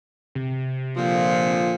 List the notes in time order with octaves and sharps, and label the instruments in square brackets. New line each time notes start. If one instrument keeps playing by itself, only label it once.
[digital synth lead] C3
[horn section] A#2 D3 F3